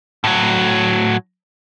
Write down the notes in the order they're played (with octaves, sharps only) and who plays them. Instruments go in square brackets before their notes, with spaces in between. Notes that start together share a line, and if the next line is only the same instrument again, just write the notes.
[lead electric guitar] A2 F#3